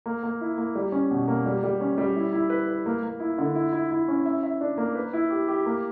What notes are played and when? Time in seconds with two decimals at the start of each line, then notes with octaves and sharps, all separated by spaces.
0.06 A#3
0.23 A#3
0.41 E4
0.58 A#3
0.75 G3
0.92 C#4
1.11 B2
1.28 A#3
1.46 G3
1.63 G3
1.81 C#4
1.98 G3
2.16 E4
2.33 E4
2.50 B4
2.68 B4
2.86 A#3
3.03 A#3
3.20 E4
3.38 D3
3.55 E4
3.73 E4
3.91 E4
4.08 C#4
4.26 E5
4.43 E5
4.61 D4
4.78 A#3
4.95 B4
5.13 E4
5.30 G4
5.48 G4
5.66 A#3